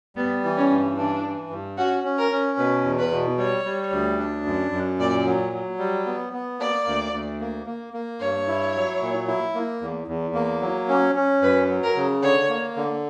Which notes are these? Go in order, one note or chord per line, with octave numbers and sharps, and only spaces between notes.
G3 B3
E3
C#4
G2
E3 D4
E3
G2
C#4 F#4
C#4
A#4
C#4
B2 B4
E2
B4
B2
G3 C#5
G3
D2
D4
F#2
F#2
A#2 D5
F#3
F#3
G3
B3
B3
A#3 D5
D2
D2
A#3
A#3
A#3
G2 C#5
E4
F#3
A#2
E4
A#3
E2
E2
A#3
F#3
C#4
C#4
F#2 B4
F#3
A#4
C#3
D3 C#5
A#3
D3